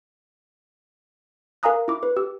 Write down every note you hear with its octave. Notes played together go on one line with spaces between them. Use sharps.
A#4 F5 G#5 A#5 D#6 F#6
E4 D6
B4
G4 E6